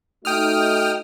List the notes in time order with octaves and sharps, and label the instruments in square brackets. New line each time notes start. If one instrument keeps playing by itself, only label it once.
[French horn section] A3 D#4 F#4 [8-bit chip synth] G5 D#6 F6